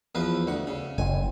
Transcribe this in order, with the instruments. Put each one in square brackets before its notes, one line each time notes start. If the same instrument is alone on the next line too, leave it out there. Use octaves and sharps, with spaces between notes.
[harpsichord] E2 F3 B4
D2 F#5
C#3
[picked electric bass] F#1 [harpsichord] G#5